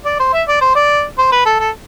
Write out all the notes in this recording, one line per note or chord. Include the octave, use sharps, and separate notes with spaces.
D5
C5
E5
D5
C5
D5
C5
B4
A4
A4